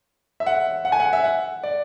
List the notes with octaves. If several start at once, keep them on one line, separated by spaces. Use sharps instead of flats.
E5
F#5
F#5
G#5
F#5
E5
F#5
D5